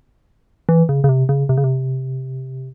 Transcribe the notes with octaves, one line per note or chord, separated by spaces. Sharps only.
E3
C#3
C#3
C3
C#3
C3
C#3
C3